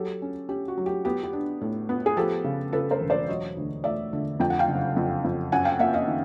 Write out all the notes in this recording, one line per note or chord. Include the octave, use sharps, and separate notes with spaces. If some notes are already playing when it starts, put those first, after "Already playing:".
Already playing: F#3 G4 A4
C#4
C#4 G4
F#4
F#3
G4
B3 G4
G4
D4
A2
B3
G#4
F3 G4 A4
C#3
C#3 A4 B4
A#4 C5
E1
C5 D5
F#3 C#5 D#5
D2
A3 D5 E5
D3
F2 G5
F#5
F5 G5
F#1
F2
F2
F#2 F#5 G#5
F5 G5
A#3 E5 F#5
D#5 F5
D#3